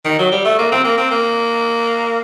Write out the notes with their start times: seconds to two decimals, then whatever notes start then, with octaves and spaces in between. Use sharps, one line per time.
0.05 D#3
0.19 F#3
0.32 G3
0.45 A3
0.58 A#3
0.72 C4
0.84 A#3
0.98 C4
1.11 A#3